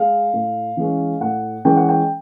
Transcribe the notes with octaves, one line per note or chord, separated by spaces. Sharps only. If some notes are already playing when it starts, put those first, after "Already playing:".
Already playing: G#3 F5
A2
E3 G#3 C#4
A2 F#5
E3 G#3 C#4 G5
F#5
G5